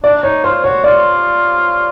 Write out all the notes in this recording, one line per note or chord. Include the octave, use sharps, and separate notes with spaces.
D4 D5
D#4 C#5
F4 C5
F#4 C#5
F4 D5